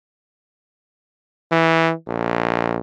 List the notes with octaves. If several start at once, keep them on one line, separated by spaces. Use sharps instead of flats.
E3
A#1